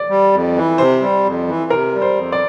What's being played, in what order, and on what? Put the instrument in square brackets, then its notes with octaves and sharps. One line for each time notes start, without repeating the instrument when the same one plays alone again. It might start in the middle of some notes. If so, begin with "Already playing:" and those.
Already playing: [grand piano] D5
[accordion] G3
F2
E3
[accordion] C3 [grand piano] C5
[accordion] G3
F2
E3
[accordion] C3 [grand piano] A#4
[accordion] G3
[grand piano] C5
[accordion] F2
[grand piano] D5